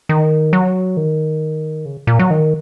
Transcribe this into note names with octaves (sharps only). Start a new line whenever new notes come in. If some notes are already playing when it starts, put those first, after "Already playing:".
D#3
F#3
D#3
C#3
A#2
F#3
D#3